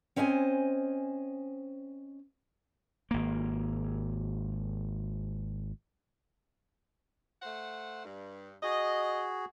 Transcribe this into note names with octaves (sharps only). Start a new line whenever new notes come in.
C4 C#4 C5 D#5 G5 G#5
G#1 A#3
A3 C5 F#5
G2
F#4 G#4 D#5